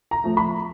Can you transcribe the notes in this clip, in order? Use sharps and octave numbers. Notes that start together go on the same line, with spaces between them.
A#5
F3 A3
B5